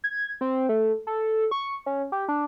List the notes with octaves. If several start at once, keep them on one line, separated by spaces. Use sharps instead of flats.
G#6
C4
A3
A4
C#6
C#4
G4
D4